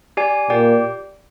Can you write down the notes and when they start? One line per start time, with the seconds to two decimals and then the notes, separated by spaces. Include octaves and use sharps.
0.17 G4 D5 G#5
0.50 A#2 G4 D5 G5